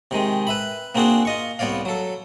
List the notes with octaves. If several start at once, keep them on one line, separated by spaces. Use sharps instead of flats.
C3 D#3 G#3
B4 E5 B5
A#3 C4 D4 F#4 G#4 C5
F4 D#5 C#6
C2 B3 C#5 D5 F5
F#3 A4